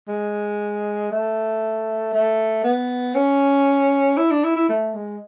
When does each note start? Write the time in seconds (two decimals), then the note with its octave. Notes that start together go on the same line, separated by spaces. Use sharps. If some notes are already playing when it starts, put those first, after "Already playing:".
0.08 G#3
1.11 A3
2.13 A3
2.64 B3
3.15 C#4
4.17 E4
4.31 D4
4.44 E4
4.56 E4
4.69 A3
4.94 G#3